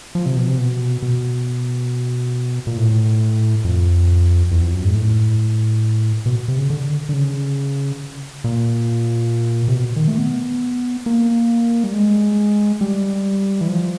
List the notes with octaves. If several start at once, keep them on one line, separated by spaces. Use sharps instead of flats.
F3
C3
B2
C3
B2
B2
A#2
A2
F2
E2
F2
F#2
G#2
A2
B2
C3
C#3
D3
D3
C#3
A#2
C3
B2
D#3
A3
B3
A#3
G3
G#3
G3
E3
F3